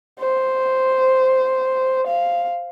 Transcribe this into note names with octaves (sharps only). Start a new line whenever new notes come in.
C5
F5